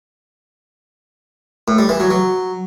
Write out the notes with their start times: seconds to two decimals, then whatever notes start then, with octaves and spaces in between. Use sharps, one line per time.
1.68 A2
1.78 G3
1.89 E3
2.00 F#3
2.11 F#3